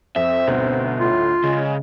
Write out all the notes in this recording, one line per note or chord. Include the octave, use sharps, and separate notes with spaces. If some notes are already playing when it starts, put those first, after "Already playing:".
F2 C4 E5
G1 D2 B2 D#4
A2 F4
C#3 G#3